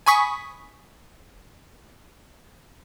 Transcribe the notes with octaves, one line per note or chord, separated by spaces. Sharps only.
G#5 B5 C#6 D#6 B6